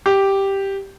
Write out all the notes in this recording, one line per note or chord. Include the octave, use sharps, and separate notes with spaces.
G4